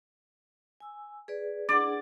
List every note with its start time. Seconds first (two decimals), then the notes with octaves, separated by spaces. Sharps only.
0.80 G#5 E6
1.28 G#4 B4 D5
1.69 D4 G#4 D5 F#5